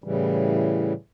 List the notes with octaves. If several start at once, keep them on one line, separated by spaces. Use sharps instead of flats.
A2 C#3 E3 G3